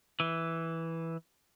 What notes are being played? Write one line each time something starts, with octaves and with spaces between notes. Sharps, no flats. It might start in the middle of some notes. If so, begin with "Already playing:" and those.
E3